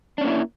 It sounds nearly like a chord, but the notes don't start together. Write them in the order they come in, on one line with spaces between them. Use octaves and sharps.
D4 C#4 A#3 E4